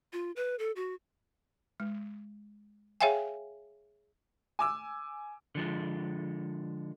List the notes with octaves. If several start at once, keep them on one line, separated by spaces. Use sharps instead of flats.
F4
B4
A4
F#4
G#3
G#4 C#5 E5 F5 G5 G#5
G#5 D6 E6
D3 F3 G#3